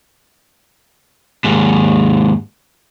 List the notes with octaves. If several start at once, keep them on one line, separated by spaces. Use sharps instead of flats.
D#2 G#2